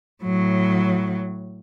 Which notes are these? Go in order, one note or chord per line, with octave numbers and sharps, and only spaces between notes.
A2 F#3